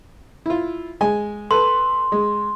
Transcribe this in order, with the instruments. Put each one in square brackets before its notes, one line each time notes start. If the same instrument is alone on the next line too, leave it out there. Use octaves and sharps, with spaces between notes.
[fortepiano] E4 F4
G#3 G#5
[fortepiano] A4 B4 [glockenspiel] C6
[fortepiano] G#3